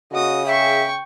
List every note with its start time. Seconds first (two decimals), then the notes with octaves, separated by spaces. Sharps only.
0.12 C#3 F#4 D#5 D#6
0.46 G#4 E5 G5 C#6